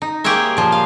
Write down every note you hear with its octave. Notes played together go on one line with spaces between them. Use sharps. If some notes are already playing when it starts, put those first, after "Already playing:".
D#4
A#3 G4 G#4 C5 C#5 E5
A#2 F3
F5